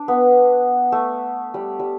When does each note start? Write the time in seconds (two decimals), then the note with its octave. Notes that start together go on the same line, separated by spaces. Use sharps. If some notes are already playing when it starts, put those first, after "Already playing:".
Already playing: D4
0.08 B3
0.92 A3
1.54 G3
1.79 G3